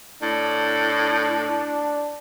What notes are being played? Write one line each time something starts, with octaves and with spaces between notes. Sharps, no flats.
A2 D4